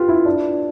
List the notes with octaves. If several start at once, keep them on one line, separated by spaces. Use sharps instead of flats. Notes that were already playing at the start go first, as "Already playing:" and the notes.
Already playing: F4 G4 B4
E4
D4